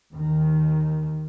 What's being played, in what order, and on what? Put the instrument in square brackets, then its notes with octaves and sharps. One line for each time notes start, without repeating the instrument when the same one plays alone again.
[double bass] D#2 D#3